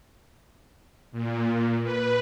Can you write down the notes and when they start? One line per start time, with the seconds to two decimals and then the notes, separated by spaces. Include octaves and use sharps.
1.12 A#2
1.84 B4